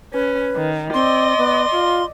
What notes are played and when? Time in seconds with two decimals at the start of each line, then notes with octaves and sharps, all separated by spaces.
0.13 C#4 B4
0.56 D#3
0.94 C4 D5 D#5 C6
1.38 B3
1.72 F4